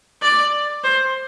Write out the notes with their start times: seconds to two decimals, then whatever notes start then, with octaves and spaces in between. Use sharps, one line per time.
0.22 D5
0.84 C5